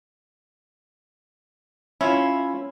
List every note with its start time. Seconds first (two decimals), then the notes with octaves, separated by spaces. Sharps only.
2.01 C#4 E4 F4